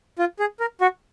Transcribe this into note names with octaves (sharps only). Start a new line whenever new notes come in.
F4
G#4
A#4
F#4